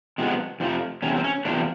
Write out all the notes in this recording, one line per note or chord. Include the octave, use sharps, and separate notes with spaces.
C3 F3 G#3 B3
F2 C3 F3 A3
E2 C3 C#4
C4
C#4
E2 C3 F3 A3 D4